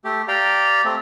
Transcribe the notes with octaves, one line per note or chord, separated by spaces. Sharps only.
A3 G4
G4 D5 F5 G5 A#5
A3 C4